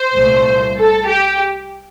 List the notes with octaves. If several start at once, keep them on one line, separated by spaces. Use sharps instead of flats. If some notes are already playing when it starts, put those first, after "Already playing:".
Already playing: C5
C2 A#2 A3
A4
G4